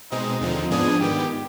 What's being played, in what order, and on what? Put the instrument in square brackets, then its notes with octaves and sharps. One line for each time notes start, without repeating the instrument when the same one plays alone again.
[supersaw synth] B2 G#3 C4 [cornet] D#4
[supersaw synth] D#2 D3 F3 C4
[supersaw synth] G#2 F3 G#3 B3 D4 [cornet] G#4
[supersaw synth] G#2 D#3 B3 [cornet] G4